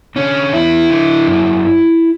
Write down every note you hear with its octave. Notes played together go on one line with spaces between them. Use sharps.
D3 C#4
E2 E4
D3
F#2